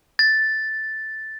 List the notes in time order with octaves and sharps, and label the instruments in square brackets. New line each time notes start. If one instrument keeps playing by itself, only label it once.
[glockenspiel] A6